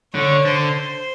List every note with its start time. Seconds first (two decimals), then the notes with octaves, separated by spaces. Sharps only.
0.14 D3 C#5
0.45 D3 C5
0.77 C5